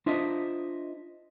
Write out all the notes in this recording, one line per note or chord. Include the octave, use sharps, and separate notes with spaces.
D4 F4 C5 D#5 E5